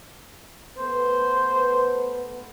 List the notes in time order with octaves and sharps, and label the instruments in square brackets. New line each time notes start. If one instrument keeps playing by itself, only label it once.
[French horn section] A3 B3 B4 [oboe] C5